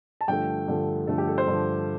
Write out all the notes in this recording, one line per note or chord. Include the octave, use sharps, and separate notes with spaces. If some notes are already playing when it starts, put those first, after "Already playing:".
A5
G2 D3 F3 A3 G5
G2 D3 F3 A3
G2 D3 F3 A3 A4
G4
A4
C5
G2 D3 F3 A3